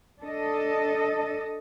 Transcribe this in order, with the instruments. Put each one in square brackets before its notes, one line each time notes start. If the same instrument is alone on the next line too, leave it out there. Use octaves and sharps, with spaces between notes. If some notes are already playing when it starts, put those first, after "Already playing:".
[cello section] D4 A4 D#5